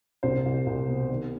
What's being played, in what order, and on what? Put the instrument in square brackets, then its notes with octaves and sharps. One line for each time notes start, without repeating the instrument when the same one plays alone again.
[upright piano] C2 C4 C5
C2
C2
B2
D#3